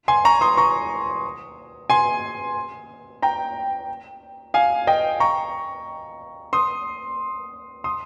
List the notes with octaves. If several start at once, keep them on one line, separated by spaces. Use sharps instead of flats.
G#5 C6
A#5 C#6
C6 D#6
A#5 C#6
G#5 C6
G5 A#5
F5 G#5
D#5 G5
A#5 C#6
C6 D#6
C6 D#6